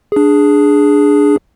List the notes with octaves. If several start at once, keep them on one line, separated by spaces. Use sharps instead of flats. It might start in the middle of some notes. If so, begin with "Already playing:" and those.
D4 G#4